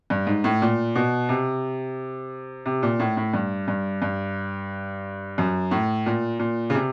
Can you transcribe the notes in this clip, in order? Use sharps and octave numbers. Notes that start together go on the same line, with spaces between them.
G2
G#2
A2
A#2
B2
C3
C3
A#2
A2
A2
G2
G2
G2
F#2
A2
A#2
A#2
C#3
C3